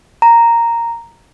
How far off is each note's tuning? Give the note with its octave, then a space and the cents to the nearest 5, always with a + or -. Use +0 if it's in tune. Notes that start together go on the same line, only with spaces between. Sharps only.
A#5 -5